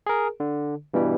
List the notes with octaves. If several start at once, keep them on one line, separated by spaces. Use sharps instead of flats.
G#4 A#4
D3
G2 B2 E3 G3